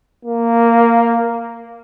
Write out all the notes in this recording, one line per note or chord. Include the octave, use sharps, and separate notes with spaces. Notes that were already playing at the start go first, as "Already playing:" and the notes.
A#3